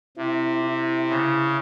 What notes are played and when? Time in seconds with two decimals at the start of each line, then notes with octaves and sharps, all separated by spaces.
0.17 C3 E4
0.64 E4
1.09 C#3